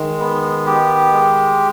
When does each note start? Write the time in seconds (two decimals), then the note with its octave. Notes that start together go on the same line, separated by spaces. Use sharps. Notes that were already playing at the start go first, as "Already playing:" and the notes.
Already playing: D#3 G#3
0.20 B3
0.66 G4
1.13 G#3